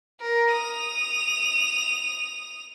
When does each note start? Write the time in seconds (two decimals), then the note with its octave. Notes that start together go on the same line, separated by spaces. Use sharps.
0.21 A#4
0.52 D#6 F7